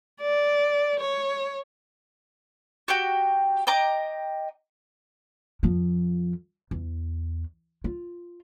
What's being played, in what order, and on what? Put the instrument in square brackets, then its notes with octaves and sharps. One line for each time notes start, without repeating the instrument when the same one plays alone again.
[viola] D5
C#5
[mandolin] F#4 G4 G5
D#5 G5 A#5 D6
[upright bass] F2 F3
E2
F4